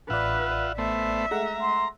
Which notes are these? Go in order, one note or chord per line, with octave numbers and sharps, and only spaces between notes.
A1 F4 B4 D5 E5 F#5
A3 B3 C5 E5
G#3 A3 F#5 A#5
C6